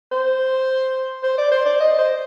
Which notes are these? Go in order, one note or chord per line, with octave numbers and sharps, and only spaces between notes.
C5
C5
D5
C5
D5
D#5
C5